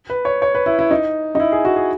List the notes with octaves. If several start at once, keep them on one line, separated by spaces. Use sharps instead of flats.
B4
C#5
C#5
B4
E4
E4
D#4
D#4
E4
G#4
F#4
G#4